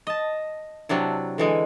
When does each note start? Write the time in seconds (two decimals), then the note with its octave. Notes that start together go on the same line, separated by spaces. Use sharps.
0.07 D#5 A5
0.89 C3 F#3 D4 E4
1.38 D3 E3 G#3